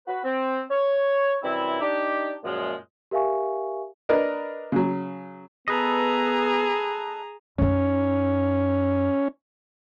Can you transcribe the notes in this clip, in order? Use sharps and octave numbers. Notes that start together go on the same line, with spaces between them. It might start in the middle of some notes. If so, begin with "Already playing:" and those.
F#4 B4
C4
C#5
F#2 C3 E3 G3 C4 E4
D4 D#4 G4
F#2 A#2 F3 G#3
G4 A#4 E5 F5 G#5 C#6
D4 A#4 B4 D#5
C#3 F#3
B3 G#4 A4 B4 D#5 A#5
F#2 C#4 D#4